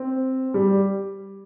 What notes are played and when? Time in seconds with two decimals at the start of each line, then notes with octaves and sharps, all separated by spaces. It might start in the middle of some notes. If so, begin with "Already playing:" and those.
Already playing: C4
0.54 G3